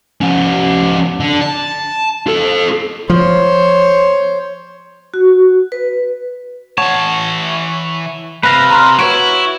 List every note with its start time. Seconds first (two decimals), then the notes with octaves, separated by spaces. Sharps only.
0.21 F3 C#4
1.20 D3
1.41 A5
2.27 F4 A4
3.10 F3 C5 C#5
5.14 F#4
5.72 B4
6.78 E3 C#5 F#5 A5
8.43 C3 B4 F5 F#6 A#6
8.71 C3 A#5 C6 F6
8.99 E4 F#4 B4 C#5 C#6 D7